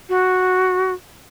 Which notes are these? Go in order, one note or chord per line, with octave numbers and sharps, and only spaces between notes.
F#4